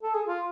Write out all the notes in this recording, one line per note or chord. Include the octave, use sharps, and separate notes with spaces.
A4
G#4
F4